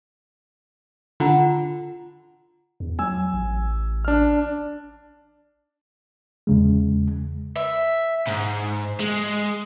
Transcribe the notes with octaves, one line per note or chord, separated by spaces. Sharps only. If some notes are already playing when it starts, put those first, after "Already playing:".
D3 F4 F#5 A#5
E2
F#3 G#5 E6
A1
D4 F6
E2 C#3 G#3
E5
G#2
G#3